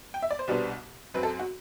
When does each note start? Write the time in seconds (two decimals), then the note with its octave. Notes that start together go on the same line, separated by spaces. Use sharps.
0.14 G5
0.22 E5
0.31 D5
0.39 C5
0.47 C2 B2 G3 B3 D4
1.14 F#2 F#3 C4 B4
1.23 A4
1.39 F#4